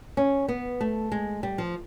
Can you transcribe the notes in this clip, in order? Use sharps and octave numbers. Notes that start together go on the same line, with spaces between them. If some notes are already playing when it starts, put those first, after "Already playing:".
C#4
B3
A3
G#3
G3
F3